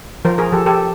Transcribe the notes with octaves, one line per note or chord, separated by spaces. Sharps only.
F3 A#4 C5
G#4 A#4
F3 G4 A4
G4 A4